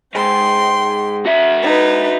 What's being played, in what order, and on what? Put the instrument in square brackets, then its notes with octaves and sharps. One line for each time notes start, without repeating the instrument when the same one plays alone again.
[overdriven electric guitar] G#2 [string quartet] G5 C6
[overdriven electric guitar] F#4 E5
[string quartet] D#4 B4